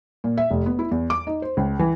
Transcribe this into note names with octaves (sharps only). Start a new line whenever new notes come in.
A#2
E5
F1
B3
E4
E2
D6
D#4
C5
C#2
E3